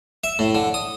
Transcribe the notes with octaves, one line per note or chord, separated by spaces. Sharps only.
E5
A2
D3
D#6